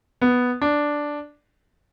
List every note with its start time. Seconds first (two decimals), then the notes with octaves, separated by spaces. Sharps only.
0.21 B3
0.62 D4